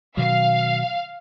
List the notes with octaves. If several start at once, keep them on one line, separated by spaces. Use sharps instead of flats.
B2 D#3 F#3 F5